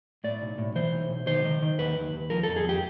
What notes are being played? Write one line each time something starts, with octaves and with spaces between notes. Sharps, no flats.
A2 D5
B1
A2
E3 C5
B1
B1
D#3 C5
D#3
D#3
D#2 B4
D#2
D#2
F3 A#4
A4
F2
G#4
F2 G4